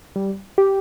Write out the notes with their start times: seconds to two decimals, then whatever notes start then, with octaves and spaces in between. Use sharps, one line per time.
0.16 G3
0.58 G4